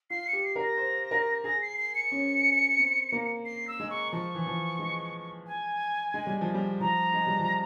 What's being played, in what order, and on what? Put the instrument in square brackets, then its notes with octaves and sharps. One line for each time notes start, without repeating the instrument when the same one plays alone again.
[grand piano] F4 [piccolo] C7
[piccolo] C#7
[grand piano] G4
[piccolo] C7
[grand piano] A#4
[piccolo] A#6
[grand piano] C5
A#4
[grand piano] G#4 [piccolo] A#6
[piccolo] C7
C7
C#7
[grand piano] C#4
C4
A#3
[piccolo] C7
E6
[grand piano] G#3
[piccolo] C#6
[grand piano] F3 [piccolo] C#6
[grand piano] E3
F3
G#3
[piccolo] G#5
[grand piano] G#3
G3
F3
G3
[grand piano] F3 [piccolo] A#5
[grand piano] G#3
G3
F3